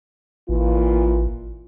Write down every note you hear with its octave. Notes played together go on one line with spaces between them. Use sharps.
A1 A#2 E3 F4